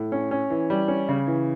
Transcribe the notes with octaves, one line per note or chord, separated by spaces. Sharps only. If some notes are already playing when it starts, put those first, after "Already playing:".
Already playing: A2
C#4
C#4
E3
G3
C#4
C#3
E3